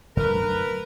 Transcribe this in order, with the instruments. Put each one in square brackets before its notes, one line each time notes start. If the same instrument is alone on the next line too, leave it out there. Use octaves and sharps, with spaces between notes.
[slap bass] F#2 D3 A3 [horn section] A#4 B4